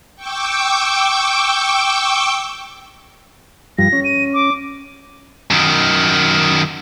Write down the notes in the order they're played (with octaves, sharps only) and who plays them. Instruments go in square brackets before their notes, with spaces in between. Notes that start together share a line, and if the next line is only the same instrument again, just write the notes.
[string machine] G5 C#6 D6 E6 G6
[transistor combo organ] G2 F3 G3 [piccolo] A#6
[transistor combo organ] C#4
[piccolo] D#7
D6
[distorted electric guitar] F#2 D#3